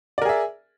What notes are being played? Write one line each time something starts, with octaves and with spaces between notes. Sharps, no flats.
G#4 A#4 D5 E5